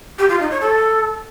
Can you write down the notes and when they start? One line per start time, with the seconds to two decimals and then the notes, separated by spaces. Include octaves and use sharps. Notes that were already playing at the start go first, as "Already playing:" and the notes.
0.19 G4
0.29 F4
0.40 D#4
0.50 C#5
0.61 A4